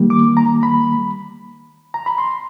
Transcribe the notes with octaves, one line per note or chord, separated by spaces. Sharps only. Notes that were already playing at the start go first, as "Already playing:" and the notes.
Already playing: D#3 G3 A#3
D6
A#5
B5
A#5
B5
C6